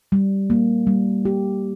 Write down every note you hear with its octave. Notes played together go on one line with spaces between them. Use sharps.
G3
A#3
G3
G4